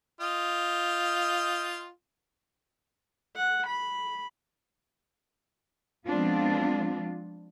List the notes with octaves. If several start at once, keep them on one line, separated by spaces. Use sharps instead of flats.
F4 D#5 G5
F#5
B5
F3 G#3 B3 C4 D4 F4